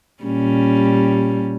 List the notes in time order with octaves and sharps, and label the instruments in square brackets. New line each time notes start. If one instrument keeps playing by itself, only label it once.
[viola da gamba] A#2 G3 C#4